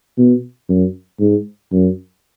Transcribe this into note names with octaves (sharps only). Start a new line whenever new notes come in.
B2
F#2
G#2
F#2